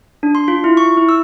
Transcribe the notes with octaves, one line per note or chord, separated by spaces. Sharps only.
D4
C6
F4
E4
C#6
E4
E6